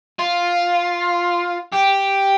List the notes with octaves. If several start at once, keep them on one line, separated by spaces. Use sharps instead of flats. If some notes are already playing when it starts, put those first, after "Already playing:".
F4
G4